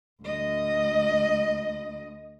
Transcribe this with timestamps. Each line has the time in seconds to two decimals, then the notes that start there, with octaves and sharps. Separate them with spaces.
0.23 D2 D#5